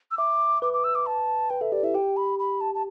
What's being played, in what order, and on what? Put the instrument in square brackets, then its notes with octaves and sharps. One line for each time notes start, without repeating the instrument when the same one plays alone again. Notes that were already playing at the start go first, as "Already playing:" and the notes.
[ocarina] E6
[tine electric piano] E5 [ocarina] D6
[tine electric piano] B4 [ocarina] D6
[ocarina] D6
E6
D6
A5
[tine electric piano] B4 [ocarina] G5
[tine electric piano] A4 [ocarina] E5
[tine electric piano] G4 [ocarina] D5
[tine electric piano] E4 [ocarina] E5
[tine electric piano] G4 [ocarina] G5
[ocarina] B5
B5
A5
A5